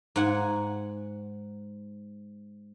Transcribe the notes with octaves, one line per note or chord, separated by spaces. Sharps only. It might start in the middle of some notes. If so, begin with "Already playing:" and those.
G#2 F#5 G#5